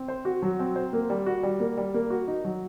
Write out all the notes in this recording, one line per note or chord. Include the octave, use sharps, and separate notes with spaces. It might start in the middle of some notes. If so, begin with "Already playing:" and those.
Already playing: C4
C5
F#4
F#3
C4
C5
A#3
G3
F#4
G3
A#3
G3
A#3
F#4
D#4
F#3